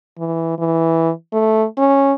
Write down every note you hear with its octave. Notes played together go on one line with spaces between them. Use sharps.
E3
E3
A3
C#4